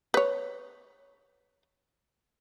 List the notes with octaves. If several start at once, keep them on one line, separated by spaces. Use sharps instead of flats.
B4 C#5